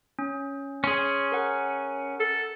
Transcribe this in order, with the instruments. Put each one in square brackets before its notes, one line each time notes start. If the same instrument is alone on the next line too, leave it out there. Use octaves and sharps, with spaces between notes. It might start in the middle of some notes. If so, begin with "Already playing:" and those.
[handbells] C#4
[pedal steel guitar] C#4 G#4 [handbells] C6
[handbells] A#4 F#5
[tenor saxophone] A4